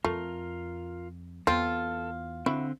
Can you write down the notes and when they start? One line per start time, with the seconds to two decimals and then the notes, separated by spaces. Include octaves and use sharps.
0.04 F2 A3 F4 A#4
1.47 E2 C4 F4 A4
2.46 D3 C4 E4 F#4